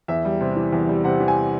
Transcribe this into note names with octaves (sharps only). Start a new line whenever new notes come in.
E2 E5
G3
C3
E3
E2
G3
C3 F#5
E3
G#5